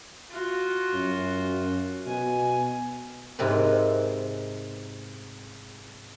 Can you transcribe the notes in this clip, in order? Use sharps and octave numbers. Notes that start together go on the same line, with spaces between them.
F4 F#4
F#2
B2 G#5
G#2 C3 A#4 B4